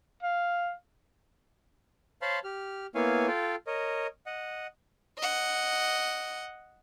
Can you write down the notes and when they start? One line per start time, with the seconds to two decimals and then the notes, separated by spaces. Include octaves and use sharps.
0.23 F5
2.22 C5 C#5 F5 A5 B5 C6
2.44 G4 F6
2.95 A#3 B3 E4 C#5 F5 G#5
3.27 F4 A4 F5 G5
3.67 A#4 C#5 D#5
4.26 D#5 F#5
5.18 D#5 F#5